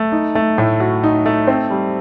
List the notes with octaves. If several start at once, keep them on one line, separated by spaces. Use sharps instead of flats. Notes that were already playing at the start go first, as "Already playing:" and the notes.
Already playing: A3
D#4
A3
A2
F#4
D#4
A3
C4
G3